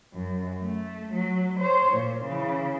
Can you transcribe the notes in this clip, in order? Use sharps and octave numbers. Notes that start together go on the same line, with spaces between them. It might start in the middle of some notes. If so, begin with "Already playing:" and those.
F#2
A3
F#3
C5 C#5
A#2
C#3 E3